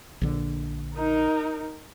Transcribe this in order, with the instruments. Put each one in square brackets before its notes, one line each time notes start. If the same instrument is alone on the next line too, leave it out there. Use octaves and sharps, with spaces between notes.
[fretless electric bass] A#1 D3
[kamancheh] D#4 A#4